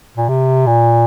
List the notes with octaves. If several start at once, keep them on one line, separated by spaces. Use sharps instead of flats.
A#2
C3
A#2